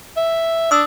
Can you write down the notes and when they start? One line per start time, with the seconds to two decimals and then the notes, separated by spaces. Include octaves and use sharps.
0.17 E5
0.71 D4 D#6 E6